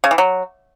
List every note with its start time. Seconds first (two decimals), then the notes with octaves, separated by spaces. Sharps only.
0.04 C#3
0.11 E3
0.18 F#3